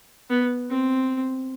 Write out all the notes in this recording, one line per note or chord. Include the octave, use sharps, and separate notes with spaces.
B3
C4